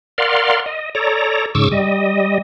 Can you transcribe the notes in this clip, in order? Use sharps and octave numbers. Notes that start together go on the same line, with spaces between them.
A#4 D5 F5 F#5 C6
D#5
A4 C#5 D5 A#5
G#2 C#3 C#6 D6 E6
G3 D#5